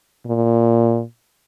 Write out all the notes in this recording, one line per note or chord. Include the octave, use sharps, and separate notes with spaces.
A#2